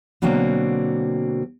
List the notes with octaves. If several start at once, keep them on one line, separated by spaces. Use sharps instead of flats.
B2 D3 F#3 A#3 C4